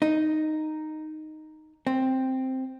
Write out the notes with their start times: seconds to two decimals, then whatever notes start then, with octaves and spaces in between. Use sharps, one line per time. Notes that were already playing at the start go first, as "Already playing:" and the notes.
0.02 D#4
1.87 C4